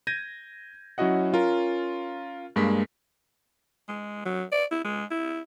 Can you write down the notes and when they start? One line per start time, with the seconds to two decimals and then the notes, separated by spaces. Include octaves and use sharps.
0.07 G6 G#6 A#6 D#7
0.98 F#3 C#4 E4 F#4 D#5 F#5
1.33 C#4 F4 A#4
2.56 G2 G#3 A#3 B6
3.89 G#3
4.26 F#3
4.52 D5
4.71 E4
4.85 G#3
5.11 E4